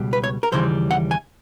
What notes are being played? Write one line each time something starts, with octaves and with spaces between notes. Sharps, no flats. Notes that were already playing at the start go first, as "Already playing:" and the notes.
Already playing: C#2 B2 G3
B4
C#5
A#4
D#2 C#3 E3 G3 C5
F#5
G#5